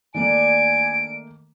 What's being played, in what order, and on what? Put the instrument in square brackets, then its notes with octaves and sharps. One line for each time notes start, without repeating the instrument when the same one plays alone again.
[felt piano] D#3 A3 A#3 [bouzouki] D4 D5 [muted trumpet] G#5 [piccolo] D7